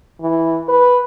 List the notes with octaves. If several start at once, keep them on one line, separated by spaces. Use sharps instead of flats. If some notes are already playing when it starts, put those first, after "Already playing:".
E3
B4